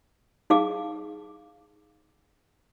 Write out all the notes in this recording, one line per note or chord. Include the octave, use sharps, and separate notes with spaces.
D#4 G#4 F5 D6